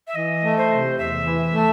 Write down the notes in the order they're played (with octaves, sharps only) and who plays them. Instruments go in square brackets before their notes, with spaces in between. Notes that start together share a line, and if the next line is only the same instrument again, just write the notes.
[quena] E5
[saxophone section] E3 [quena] D#5
[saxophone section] A3
[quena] C5
[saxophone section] C3
[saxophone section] E2 [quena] E5
[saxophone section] E3
A3